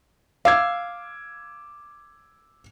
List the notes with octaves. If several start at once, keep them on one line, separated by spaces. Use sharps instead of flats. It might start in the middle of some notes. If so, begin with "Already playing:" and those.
F5 D6 E6 G#6